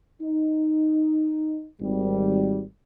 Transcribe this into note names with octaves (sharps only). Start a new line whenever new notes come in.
D#4
G#1 G3